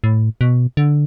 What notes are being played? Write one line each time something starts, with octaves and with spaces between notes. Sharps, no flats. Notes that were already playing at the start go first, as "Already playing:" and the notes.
A2
B2
D3